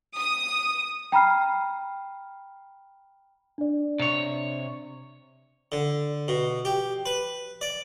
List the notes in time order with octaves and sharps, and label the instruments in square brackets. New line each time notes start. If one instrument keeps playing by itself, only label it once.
[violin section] D#6
[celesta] G5 A#5 B5 F6 C7
D4 D5
[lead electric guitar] C3 C#5
[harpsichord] D3
B2
G4
B4
D5